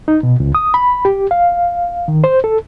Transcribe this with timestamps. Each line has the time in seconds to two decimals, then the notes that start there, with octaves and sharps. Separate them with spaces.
0.08 D#4
0.23 B2
0.40 C#2
0.55 D#6
0.74 B5
1.05 G4
1.31 F5
2.08 D#3
2.24 C5
2.44 A4